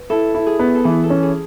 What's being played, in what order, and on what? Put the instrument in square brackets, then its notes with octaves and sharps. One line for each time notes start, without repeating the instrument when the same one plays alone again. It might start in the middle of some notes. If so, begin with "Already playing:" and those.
Already playing: [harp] B4
[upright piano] E4 [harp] A4
[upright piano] E4
[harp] G#4
[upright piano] B3
[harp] A4
[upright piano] E3 [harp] G#4
[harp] A4
[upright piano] C#4
[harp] G#4